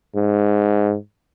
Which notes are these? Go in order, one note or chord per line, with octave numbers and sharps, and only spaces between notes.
G#2